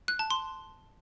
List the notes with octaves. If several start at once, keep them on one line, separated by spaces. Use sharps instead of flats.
F#6
A5
C6